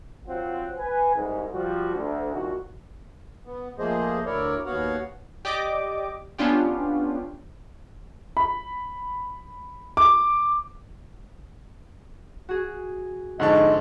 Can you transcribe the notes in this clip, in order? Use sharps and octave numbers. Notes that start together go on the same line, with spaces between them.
F#3 C4 F4 C5 F#5
B4 G#5
C2 G#2
F3 G3 F#4
D2
C2 A#2 D#3 F#4
B3
F3 A3 A#3 G#4 C5 D#5
D2 E4 A#4 C#5 D5
D#2 B3 F#4 C#5 F5 F#5
G4 D5 D#5 D6
B3 C#4 D4 F4 G4
B5
D6
F#4 G#4
F2 G#2 D3 D#5 F#5 A5 C6 C#6